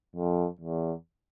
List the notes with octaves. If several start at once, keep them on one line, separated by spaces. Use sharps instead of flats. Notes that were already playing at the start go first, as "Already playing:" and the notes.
F2
E2